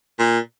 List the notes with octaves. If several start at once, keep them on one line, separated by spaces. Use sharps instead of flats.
A#2